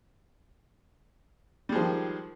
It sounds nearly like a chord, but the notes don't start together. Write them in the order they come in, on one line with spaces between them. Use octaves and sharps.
G3 G#3 F3 D#3